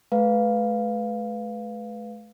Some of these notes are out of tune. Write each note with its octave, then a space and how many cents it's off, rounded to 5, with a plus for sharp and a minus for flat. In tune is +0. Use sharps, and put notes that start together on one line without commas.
A3 -40 B4 +0 F5 +0